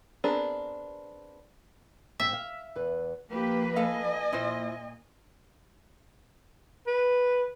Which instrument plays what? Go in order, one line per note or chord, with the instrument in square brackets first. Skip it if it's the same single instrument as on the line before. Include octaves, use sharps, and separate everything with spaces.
[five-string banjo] B3 C4 D4 G#4 A#4
[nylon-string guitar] G#2 C4 [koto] E5
[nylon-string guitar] F5
E2 B4
[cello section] F3 A#3 B4 [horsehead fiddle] G4
[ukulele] A4 F5 [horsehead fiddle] D#5 G#5
[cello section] A#2 [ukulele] E4 F4 C5
[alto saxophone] B4